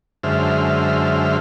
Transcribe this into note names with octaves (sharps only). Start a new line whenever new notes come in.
F#2 D3 G#3 C5 E5 F6